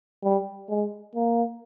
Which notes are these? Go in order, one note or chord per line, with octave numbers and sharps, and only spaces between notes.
G3
G#3
A#3